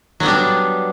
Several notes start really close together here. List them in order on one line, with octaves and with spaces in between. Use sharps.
F#3 B3 G3 D4